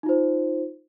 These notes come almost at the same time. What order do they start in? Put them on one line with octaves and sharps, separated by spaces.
D#4 F4 C5